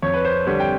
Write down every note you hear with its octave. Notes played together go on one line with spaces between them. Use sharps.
F2 C#5
B4
C5
D3 G3 C#5
G5